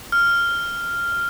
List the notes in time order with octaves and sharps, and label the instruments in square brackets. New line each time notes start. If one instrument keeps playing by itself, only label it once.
[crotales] F6